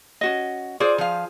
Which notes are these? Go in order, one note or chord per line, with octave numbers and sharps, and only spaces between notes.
C#4 F#4 D#5
F4 G#4 C5 D5
F3 F5